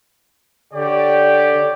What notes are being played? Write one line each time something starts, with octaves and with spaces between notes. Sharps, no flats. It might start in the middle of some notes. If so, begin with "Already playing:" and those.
D3 G4 C#5 D5